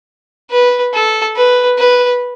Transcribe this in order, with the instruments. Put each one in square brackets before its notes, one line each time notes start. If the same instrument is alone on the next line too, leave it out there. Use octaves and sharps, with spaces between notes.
[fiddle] B4
A4
B4
B4